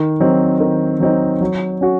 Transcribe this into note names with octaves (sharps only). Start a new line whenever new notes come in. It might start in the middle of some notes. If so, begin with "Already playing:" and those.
Already playing: D#3
F#3 C4 D#4
D#3
F#3 C4 D#4
F#3
C#4 F#4